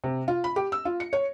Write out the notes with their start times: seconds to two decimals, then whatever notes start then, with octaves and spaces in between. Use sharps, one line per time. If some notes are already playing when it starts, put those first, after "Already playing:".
0.04 C3
0.28 F4
0.44 B5
0.56 G4
0.72 E6
0.85 F4
1.00 C#7
1.13 C#5